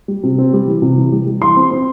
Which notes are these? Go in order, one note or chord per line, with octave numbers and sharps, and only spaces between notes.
G3
C3
C4
G3
E3
C3
E3
G3
G3
E3 C6
C4
C4